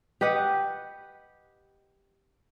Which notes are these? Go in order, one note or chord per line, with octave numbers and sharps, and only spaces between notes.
G4 B4 D#5 F#5